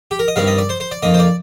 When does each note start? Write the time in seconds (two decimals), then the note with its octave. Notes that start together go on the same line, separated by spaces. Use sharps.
0.11 G4
0.19 A#4
0.28 D#5
0.36 G2 D#3 G3 C4 F5
0.47 D#5
0.58 D5
0.69 C5
0.80 C5
0.91 D5
1.03 F2 D#3 A#3 D#5
1.14 C5
1.19 D5